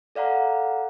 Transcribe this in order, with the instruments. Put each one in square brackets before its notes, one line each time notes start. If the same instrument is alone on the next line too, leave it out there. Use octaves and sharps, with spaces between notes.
[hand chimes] A4 D5 F5 F#5 A#5